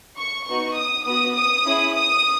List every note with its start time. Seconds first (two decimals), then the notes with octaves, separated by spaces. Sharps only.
0.19 C#6
0.48 B3 D#4 F#4 C#6
0.77 D#6
1.06 B3 F#4 D#6
1.36 D#6
1.65 C#4 E4 G#4
1.94 D#6